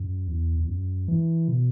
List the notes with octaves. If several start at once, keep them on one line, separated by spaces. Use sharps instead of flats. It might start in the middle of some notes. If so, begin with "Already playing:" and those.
Already playing: F#2
E2
E2
F#2
E3
B2